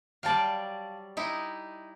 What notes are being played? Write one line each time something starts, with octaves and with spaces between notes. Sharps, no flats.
F#3 G3 D5 F5 G5 A5
D#4 E4 G4 D#5